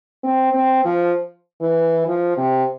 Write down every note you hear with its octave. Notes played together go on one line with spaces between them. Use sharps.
C4
C4
F3
E3
F3
C3